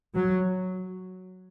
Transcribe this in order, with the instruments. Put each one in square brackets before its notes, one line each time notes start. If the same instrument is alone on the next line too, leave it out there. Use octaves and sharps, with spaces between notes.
[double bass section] F#3